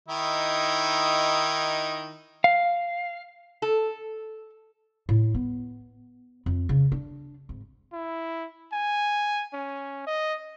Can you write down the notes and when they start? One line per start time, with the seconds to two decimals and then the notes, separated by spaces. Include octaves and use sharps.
0.08 D#3 D#4 E4
2.44 F5
3.62 A4
5.09 A2
5.34 B3
6.46 F2
6.69 C#3
6.92 D4
7.49 G#1
7.93 E4
8.72 G#5
9.53 C#4
10.07 D#5